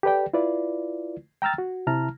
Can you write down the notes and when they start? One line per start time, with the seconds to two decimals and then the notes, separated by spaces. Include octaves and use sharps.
0.03 G4 A4 B4 D5 G5
0.33 E4 F4 B4 D5
1.42 G5 A#5 E6 F6 A6
1.58 F#4
1.87 C3 E4 A5 A#5 F6